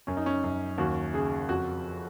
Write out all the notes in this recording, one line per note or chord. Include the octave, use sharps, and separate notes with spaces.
F#2 C#4
D#4
C#4
F#2
D#2 F#4
C#3 G#4
F2 F#4